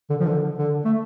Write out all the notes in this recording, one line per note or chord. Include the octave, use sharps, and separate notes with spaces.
D3
F3
D3
D3
A3